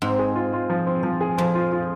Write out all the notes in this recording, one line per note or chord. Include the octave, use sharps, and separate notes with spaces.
G#2 C4
G#4
F4
F4
F3
C4
F3
G#4
F2 F3
F4
F4